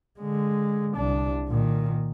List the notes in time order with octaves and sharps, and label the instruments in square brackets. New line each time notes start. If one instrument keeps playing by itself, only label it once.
[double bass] D3 G#3
C2 D4
A#2 D#3